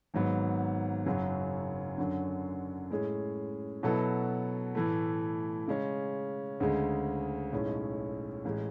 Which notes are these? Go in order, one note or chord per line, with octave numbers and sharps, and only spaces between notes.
G#1 G#2 F#3 B3
F#1 F#2 C#3 F#3
F#2 D3 F#3
A2 G#3 C#4 G#4
B2 F#3 B3 E4 A4
A2 E3 A3
C#3 G#3 C#4
D2 C#3 G#3
B1 A2 G#3 C#4
A1 G#3